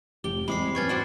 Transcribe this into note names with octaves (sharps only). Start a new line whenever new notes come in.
F1 G4 G7
E2 G#3 C4 E4 B5 D6 C7
F#2 B3 C#4 C#6 G#6 A6
D4 F#4 C5